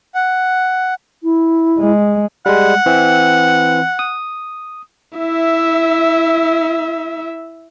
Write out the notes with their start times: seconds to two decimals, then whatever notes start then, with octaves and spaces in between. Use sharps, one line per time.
0.15 F#5
1.23 E4
1.79 G#3
2.46 G3 G#3 F#5
2.86 E3 C4
3.99 D#6
5.18 E4 E5